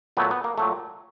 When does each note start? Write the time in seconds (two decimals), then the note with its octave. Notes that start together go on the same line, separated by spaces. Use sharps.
0.17 A#2 F#3 A3 B3
0.31 B3
0.44 A#3
0.58 A#2 F#3 A3